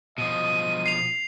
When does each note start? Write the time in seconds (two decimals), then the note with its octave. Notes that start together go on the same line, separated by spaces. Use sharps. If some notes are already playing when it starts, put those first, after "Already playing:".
0.18 B2 F3 D#5 D#7
0.86 C7 F7